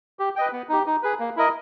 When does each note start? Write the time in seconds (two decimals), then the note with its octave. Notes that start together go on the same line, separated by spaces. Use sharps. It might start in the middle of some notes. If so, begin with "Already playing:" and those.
0.19 G4
0.36 B4 D#5 G5
0.52 B3
0.69 D#4 G4
0.86 D#4
1.03 G#4 B4
1.20 A#3
1.36 E4 A#4 D#5